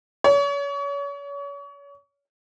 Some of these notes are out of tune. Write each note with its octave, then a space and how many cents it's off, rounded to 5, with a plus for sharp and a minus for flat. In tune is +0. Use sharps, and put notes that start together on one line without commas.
C#5 +35